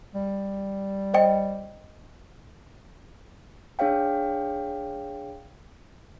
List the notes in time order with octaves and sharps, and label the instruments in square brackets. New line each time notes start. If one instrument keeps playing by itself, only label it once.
[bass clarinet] G3
[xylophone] C5 D#5 G5
[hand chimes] D4 G#4 C#5 F5 G5